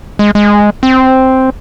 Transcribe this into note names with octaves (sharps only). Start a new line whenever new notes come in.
G#3
G#3
C4